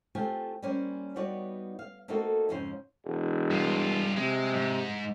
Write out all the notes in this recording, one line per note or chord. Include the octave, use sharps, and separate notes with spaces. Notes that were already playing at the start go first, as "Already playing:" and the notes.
A3 C4 F4 G4 G#5
G3 A#3 C#4 C5 G#5
G3 B3 D#4 F#4 C#5 D5
F5
A3 A#3 C4 D#4 F#4 A4
F2 G#2 C#3 C#4 F4 C5
E1
G2 F4
C3 G#3
G#2